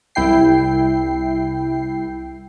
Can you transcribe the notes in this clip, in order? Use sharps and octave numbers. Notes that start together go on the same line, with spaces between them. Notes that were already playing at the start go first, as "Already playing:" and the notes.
C2 E4 G5 C7